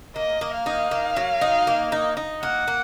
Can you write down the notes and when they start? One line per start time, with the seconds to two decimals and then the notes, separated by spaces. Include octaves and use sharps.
0.16 A#3 D#5
0.41 A#3
0.54 F5
0.66 D#4
0.91 A#3
1.16 F#3
1.41 D#4
1.67 A#3
1.92 D#4
2.17 D#4
2.42 A#3 F#5
2.68 A#3